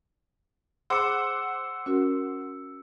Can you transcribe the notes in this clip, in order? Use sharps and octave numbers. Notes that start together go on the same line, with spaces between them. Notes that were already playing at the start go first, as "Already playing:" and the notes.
G#4 C5 F#5 B5 D6 E6 C#7
C#4 F#4 A#4